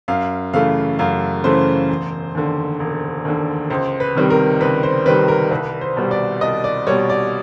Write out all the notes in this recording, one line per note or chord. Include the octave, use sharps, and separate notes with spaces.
F#2 F5
C#3 E3 A3 F5
F#2 F5
C#3 E3 A3 C5
E1
D#2 D3
E1
D#2 D3
C#2 C5
B4
C3 D#3 G3 C4
A#4
C#2 B4
C5
C3 D#3 G3 C4 B4
A#4
C2 B4
C5
B2 G3
D5
C2 D#5
D5
B2 G3 C#5
D5